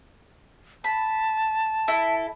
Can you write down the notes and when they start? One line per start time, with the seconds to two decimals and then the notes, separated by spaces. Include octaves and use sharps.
0.84 A5 B5
1.88 E4 A4